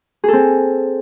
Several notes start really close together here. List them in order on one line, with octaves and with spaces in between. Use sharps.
G#4 A4 C4